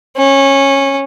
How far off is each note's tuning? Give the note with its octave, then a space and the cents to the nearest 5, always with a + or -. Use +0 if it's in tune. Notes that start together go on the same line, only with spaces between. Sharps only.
C#4 -15